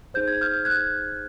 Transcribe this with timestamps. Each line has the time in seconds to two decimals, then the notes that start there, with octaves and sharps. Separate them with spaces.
0.14 D#4 G#4 C5 G6
0.28 G#6
0.41 F6 G6
0.65 F#6 G#6